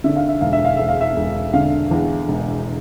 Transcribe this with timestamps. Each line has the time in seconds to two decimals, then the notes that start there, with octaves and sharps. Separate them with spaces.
0.04 D3 E5
0.16 F5
0.28 E5
0.41 E1 F5
0.53 E5
0.65 F5
0.77 E1 E5
0.88 F5
1.01 E5
1.16 E1
1.53 D3 F5
1.91 E2
2.28 E1